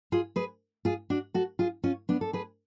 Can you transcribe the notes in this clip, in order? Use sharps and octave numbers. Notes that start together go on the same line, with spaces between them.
F4 G#4
G#4 B4
F4 G#4
D4 F#4
F#4 A4
F4 G#4
C#4 F4
B3 D4
A4
G#4 B4